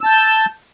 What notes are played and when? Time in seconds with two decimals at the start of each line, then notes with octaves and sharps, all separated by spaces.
0.01 E6
0.04 A5
0.06 G6